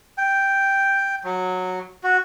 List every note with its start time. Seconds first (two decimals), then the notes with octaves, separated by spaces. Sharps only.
0.18 G5
1.24 F#3
2.04 F#4